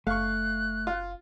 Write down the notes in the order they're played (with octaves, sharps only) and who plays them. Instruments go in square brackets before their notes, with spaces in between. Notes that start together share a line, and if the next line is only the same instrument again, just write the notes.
[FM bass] F#1 [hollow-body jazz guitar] A3 [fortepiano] F5 C#6 [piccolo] F#6
[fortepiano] F4